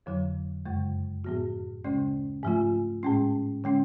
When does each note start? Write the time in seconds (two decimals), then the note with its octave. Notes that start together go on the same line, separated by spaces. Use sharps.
0.06 F2 D3 F#3
0.66 F#2 C#3 G#3
1.24 A2 F3 B3 F#4
1.84 D2 C#3 G#3 C#4
2.43 G#2 F3 A3 F4
3.03 A2 G#3 C#4
3.64 D3 G#3 C#4